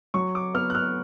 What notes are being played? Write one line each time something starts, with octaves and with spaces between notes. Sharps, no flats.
F#3 C#6
D6
B3 F6
F#6
F6